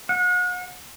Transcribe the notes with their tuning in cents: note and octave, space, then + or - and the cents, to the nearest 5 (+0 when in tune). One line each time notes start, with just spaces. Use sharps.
F#5 -40